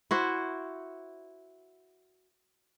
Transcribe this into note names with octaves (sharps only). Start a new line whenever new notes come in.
E4 F#4 C5